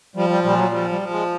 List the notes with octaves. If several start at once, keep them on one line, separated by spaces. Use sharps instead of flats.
F3 G3
G3
A#2 G3
F#3
F3 G3
G3
F3
G#3